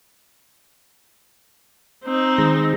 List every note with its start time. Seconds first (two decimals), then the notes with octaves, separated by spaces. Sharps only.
2.04 C4 D#4
2.38 D#3 G#3 A#5